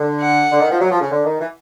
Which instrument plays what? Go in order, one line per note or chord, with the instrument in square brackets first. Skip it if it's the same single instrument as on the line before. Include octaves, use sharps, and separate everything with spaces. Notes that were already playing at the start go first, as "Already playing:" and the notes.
Already playing: [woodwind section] D3
[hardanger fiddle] F#5
[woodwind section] D3
D#3
F3
F#3
F3
C#3
D3
D#3
E3